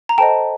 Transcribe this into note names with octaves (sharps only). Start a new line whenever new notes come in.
A#5
A4 C5 D#5 G5 A5